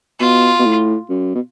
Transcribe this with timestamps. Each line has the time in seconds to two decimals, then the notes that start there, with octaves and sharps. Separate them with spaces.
0.20 B2 F4
0.59 B2
0.65 A2
1.09 F#2
1.35 B2